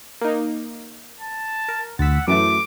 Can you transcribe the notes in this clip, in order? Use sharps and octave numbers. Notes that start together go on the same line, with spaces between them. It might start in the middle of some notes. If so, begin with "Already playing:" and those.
A#3 D#4
A5
A#4
D2 F#5 E6 A6 B6
F#2 E3 F#3 A3 D6